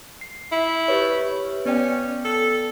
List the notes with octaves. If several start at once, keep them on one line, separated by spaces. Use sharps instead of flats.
C7
E4
G4 B4 C#5
B3 C#4 D5 G5
A4